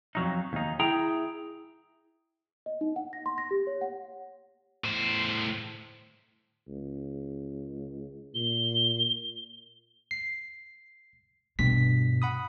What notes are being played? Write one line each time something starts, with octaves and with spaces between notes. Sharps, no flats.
F2 F#3 D#4
D#2 D#4
E4 G#4 G5 A#5
D#5
D#4
F#5
A#6
C6
A#6
G4
C#5
F#5
A2 C5
C#2
A#2 G7
C7
G2 B2 B6
F#5 B5 D#6